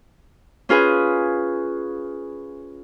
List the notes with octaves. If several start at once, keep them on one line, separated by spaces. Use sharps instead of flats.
C#4 F4 G#4 B4